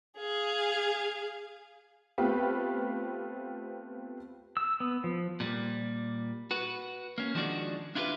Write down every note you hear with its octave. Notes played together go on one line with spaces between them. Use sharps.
G#4 F5
A3 B3 C4 F4 G4 B4
E6
B3
F3
A#2 G3
F#4 B4
A#3 C#4
D#3 F3 G#3 D4 F#4 D5
D4 E4 F4 G4 G#4 B4